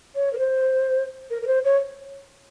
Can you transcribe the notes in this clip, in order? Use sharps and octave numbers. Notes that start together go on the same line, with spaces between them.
C#5
A#4
C5
A#4
A#4
C5
C#5